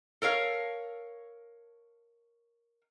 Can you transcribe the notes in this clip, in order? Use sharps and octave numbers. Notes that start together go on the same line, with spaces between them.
A4 A#4 C#5 F5